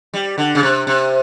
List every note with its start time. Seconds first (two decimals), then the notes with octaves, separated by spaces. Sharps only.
0.14 G3
0.38 D3
0.55 C#3
0.63 C3
0.87 C3